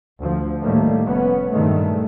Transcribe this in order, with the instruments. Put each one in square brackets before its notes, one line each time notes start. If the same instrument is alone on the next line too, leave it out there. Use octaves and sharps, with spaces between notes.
[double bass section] D2 F3
A2 D#3 G3 A3 A#3
F1 B3 C#4
G2 A#2 D#3 G#3 A3